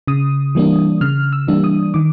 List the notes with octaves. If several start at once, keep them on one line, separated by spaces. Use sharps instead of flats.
C#3 D#6
E3 G3 A#3 D4
C#3 F6
E6
E3 G3 A#3 D4
D#6
D#3 D6